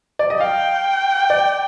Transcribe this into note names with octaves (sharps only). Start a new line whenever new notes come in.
D5
D#5
F5 G5
D5